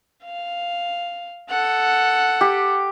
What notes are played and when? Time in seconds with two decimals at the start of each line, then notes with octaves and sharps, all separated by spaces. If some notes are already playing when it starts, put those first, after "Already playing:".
0.24 F5
1.50 A4 F#5
2.41 G4